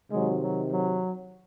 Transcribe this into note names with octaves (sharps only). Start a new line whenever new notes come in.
C3 D#3 F#3 G#3
F#3
F#3